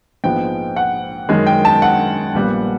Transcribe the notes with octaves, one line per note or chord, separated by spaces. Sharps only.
A#1 G#2 F3 G#3 B3 G5
F#5
F#2 D#3 G#3
G5
A5
F#5
A#1 A#2 G3 B3